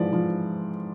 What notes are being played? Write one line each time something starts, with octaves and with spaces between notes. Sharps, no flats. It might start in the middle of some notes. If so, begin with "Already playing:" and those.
Already playing: G#2 E3 F3 D5
F3